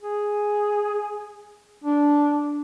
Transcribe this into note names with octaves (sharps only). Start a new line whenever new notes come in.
G#4
D4